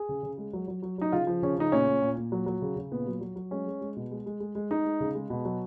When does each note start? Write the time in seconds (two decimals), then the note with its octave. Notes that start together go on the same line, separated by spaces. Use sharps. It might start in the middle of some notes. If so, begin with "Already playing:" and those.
Already playing: G#4
0.09 C#3
0.23 C#3
0.38 G#3
0.53 F#3
0.68 F#3
0.82 F#3
0.98 F#3 D#4
1.12 C#3 F4
1.27 F3
1.42 C#3 C#4
1.57 C#3 D#4
1.72 A#2 C#4
1.87 A#2
2.02 A#2
2.17 A#2
2.32 F#3
2.46 F#3
2.62 C#3
2.76 C#3
2.91 A#2 B3
3.07 F#3
3.21 F#3
3.36 F#3
3.51 G#3 C#4
3.67 G#3
3.82 G#3
3.96 B2
4.11 G#3
4.26 G#3
4.40 G#3
4.55 G#3
4.71 G#3 D#4
4.85 G#3
5.00 C#3
5.15 G#3
5.30 B2
5.45 F#3